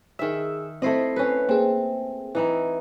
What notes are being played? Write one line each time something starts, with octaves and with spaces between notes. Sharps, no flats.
D#3 G#4 E5 E6
A3 C4 E4 C5 D#5 C7
C#4 B4
A#3 C4 G#4
E3 D#4 E4